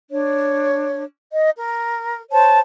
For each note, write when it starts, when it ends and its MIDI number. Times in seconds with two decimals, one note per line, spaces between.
0.10 1.04 62
0.10 1.04 73
1.31 1.49 75
1.56 2.20 70
2.31 2.59 72
2.31 2.59 73
2.31 2.59 81